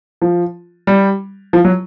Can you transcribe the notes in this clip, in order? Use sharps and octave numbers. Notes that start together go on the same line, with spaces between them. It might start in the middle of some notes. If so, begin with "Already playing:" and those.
F3
G3
F3
F#3